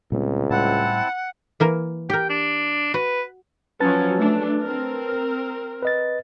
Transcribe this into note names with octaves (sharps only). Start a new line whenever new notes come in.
C#2 A#2 G3 C4
A2 G3 C4 E4 F#5 A5
E3 A#3 A#4
G4 A#4 G5
D4
F#4 B4
F3 F#3 C#4 B4 A5 A6
A3 D4
C4 A#4
B4 D#5 A6